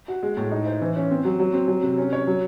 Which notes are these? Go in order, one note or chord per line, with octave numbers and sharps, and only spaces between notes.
F#4
G#3
A2
D#4
C5
E3
C#4
C4
F#3
F#3
C4
F#3
C3
C#4
C#5
F#3